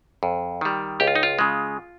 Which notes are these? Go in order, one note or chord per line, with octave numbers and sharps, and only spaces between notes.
F2
D#3 G3
C#2 G4
F4
D#4
F4
C#3 G#3